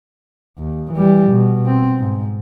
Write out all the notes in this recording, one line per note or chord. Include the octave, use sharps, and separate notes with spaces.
D#2
E3 G3
B2
C4
G#2